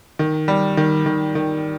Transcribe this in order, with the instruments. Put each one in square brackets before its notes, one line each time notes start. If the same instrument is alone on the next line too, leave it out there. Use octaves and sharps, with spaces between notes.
[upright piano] D#3
G3
D#3
D#3
D#3